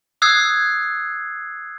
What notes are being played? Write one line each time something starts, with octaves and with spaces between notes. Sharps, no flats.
D#6 E6 F#6 G#6 C7